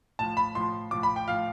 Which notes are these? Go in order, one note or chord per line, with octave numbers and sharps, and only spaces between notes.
A2 F3 A5
B5
A2 F3 C6
A2 F3 D6
B5
G5
A2 F3 F5